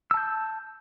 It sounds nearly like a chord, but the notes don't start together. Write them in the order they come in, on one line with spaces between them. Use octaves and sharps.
E6 A5 G6